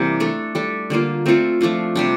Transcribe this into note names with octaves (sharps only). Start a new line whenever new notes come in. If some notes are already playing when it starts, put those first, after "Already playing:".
Already playing: C3 E3 G3 A#3
A3 D4 A4
G3 D4 A4
D3 G3 A#3 F4
A3 C4 F4 A4
F3 A3 D4 F4
C3 G3 D4